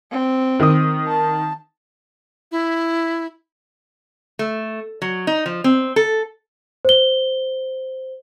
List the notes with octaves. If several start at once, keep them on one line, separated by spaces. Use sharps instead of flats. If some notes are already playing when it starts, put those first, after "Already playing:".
C4
D#3 D#6
A5
E4
A3
F#3
D#4
F3
C4
A4
C5 G7